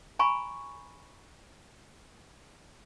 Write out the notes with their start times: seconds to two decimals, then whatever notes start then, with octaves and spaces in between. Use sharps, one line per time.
0.19 G#5 A#5 B5 C#6